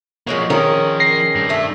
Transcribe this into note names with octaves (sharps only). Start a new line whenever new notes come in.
F3 G#3 A#3 C#4 F#4
D#3 F3 C#4 G#4 A#4
A#6 C7
G2
A3 G#5